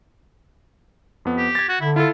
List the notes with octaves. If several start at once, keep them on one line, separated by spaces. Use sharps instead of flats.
F2 B3
G4
G#6 A6
F#4
D3 E4
E4 F4 A4